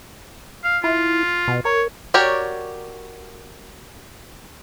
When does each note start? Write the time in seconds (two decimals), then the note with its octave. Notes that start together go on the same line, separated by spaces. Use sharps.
0.64 F5
0.84 E4 F4
1.48 B2
1.65 A#4 C#5
2.14 F#4 G4 A#4 C#5 D5